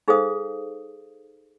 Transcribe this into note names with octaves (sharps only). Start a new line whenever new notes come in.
D#4 G#4 A4 C5 F5 D#6